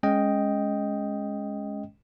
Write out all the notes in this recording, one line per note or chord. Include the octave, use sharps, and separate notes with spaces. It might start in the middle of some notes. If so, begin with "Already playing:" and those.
G#3 C#4 D#5 G5